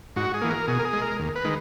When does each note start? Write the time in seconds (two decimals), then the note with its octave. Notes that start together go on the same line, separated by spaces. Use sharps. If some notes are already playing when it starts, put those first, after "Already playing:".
0.16 G#2 F#4
0.34 G#4
0.41 E3 A#3
0.51 A#4
0.68 B2 G#4
0.79 A#4
0.85 G#4
0.93 G#3
1.02 A#4
1.19 D#2
1.35 B4
1.45 D#3 G#3